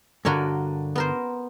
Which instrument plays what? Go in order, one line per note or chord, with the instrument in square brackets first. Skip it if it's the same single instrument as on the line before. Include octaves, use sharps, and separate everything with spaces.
[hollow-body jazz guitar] G2 D3 [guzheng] F#4 A#4 C#5
[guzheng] B3 A#4 C5